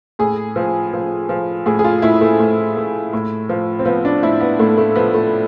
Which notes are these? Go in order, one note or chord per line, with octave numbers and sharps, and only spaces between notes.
A2 G#4
F3
F3
F3
A2 G#4
G#4
F4
A2 E4
A3
A2
A2
A2
F3
C4
F3 B3
D4
A2 E4
B3
A2 A3
A3
F3 B3
A3